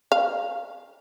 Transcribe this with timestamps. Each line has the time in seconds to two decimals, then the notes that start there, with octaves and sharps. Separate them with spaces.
0.12 F5